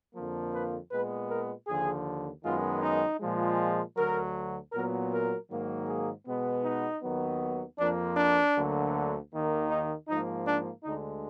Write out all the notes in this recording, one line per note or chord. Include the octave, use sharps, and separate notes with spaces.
F2 D3 F3 A#3
B4
A#2 G#3 B3 B4
A#4
D#2 D3 F3 G#4
F#2 D#3 G#3 B3 F4
D#4
A#2 F3 G#3
D2 D3 F#3 A#4
A#2 F#3 B3 A#4
A#4
G#2 D#3 F#3 A#3
G#4
B2 G#3 B3
D#4
D#2 D#3 F#3 B3
F2 F3 A#3 D4
D4
D2 D3 F#3 A#3
D#2 D#3 A#3
D#4
G#2 F3 A#3 D#4
D4
D2 D3 G#3 D#4